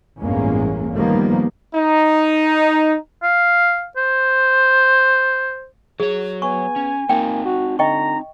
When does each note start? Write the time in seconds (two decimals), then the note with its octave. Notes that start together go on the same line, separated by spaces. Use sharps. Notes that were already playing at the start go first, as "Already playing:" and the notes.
0.20 A1 E2 G2 G#3 A#3 C#4
0.95 D#3 F3 G3 A#3 B3
1.75 D#4
3.23 F5
3.97 C5
6.00 F#3 G#4 C#5
6.42 B3 G#5 C#6
6.76 C#4
7.09 A#3 C4 D#4 G5
7.45 F#4
7.79 D3 D#5 G5 A#5 C#6